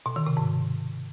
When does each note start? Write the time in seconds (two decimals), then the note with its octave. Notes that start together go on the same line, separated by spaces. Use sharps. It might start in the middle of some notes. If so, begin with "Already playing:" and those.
0.06 B2
0.16 D#3
0.26 C3
0.37 G#2